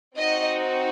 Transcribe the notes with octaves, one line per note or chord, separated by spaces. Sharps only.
C4 D#4 F#4 D#5